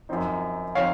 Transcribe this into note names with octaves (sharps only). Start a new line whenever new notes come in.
F#2 F3 C4 D#4
F3 C4 D#4 C#5 F5